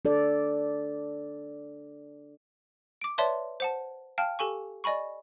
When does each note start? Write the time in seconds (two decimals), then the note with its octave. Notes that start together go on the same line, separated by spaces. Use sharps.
0.05 D4 A4 D5
3.01 D6 D7
3.18 B4 C#5 D5 E5 A5 C6
3.60 C5 F#5 A5
4.18 F5 G5 A5 F6
4.39 G4 A4 G#5 C#6
4.84 D5 D#5 G#5 B5 C#6